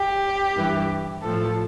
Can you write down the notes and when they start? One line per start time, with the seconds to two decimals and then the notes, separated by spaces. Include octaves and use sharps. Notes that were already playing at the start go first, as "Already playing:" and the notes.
Already playing: G4
0.56 G2 E3
1.21 A2 F3 A4